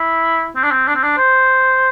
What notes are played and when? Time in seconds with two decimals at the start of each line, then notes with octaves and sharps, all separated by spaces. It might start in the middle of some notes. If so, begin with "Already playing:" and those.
Already playing: E4
0.56 C4
0.63 D4
0.71 C4
0.88 D4
0.95 C4
1.03 D4
1.17 C5